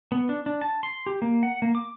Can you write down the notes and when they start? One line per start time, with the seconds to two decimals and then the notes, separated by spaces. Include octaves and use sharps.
0.12 B3
0.29 D4
0.46 D4
0.61 A5
0.83 C6
1.06 G4
1.22 A#3
1.43 F#5
1.62 A#3
1.75 D6